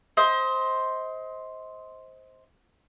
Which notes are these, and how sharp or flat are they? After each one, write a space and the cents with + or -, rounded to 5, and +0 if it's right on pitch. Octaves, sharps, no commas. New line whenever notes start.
C5 +0 D#5 +30